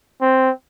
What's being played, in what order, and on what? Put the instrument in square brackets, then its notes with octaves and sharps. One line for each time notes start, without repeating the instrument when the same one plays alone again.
[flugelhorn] C4